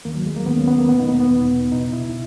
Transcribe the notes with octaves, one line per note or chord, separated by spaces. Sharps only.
D#2 D#3 A#3
F#3
G#3
A#3
D#2 D#3 B3
C#4
B3
A#3
E2 B2 B3
D#4
B3
B3
E2 B2
C#2 B2 D#4
E4